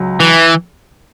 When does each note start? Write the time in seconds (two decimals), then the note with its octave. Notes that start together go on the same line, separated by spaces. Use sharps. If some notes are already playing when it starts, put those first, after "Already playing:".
Already playing: C#2 F#3
0.20 E3